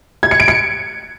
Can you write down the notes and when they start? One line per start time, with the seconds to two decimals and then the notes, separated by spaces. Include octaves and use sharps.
0.23 G#6
0.31 C#7
0.40 D7
0.48 C#7